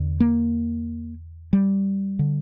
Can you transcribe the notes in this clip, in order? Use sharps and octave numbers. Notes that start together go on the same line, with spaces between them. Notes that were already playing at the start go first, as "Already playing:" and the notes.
Already playing: E2 D3
A#3
G3
D3